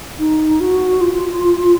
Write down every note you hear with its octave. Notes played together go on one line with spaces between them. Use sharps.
D#4
F#4
F4